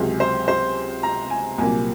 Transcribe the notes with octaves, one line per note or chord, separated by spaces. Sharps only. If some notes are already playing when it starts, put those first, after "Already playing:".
Already playing: C#2 C3 F#3 G#4
C5
C5
A#5
G#5
C2 A#2 F#3 A#3 G#5